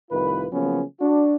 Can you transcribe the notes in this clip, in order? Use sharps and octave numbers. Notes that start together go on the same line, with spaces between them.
C2 A2 D#3 F4 B4
C#3 F3 F#3 A#3 B3 C#4
D4 F#4